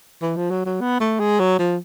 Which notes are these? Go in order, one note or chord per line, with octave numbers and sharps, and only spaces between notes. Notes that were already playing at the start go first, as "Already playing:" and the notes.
E3
F3
F#3
F#3
B3
A3
G#3
F#3
F3